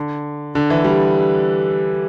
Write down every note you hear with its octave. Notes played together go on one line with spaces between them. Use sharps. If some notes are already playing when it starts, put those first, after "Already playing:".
Already playing: D3
D3
E3
G3